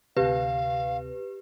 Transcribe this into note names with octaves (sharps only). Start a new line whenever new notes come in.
D2 C3 G4 B4 F5